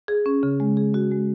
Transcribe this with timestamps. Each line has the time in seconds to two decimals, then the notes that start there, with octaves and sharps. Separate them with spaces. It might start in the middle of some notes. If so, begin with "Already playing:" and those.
0.08 G#4
0.26 C#4
0.43 C#3
0.60 G#3
0.77 G#4
0.94 F#4
1.11 G#3